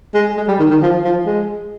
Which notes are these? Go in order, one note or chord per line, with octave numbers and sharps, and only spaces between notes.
G#3
G#3
G3
D#3
D#3
F3
F3
G#3